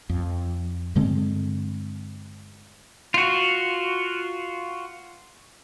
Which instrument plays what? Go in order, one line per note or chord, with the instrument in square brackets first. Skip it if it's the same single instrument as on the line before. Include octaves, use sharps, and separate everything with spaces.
[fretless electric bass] F2
G2 D3 G#3 C4
[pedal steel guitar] F4 F#4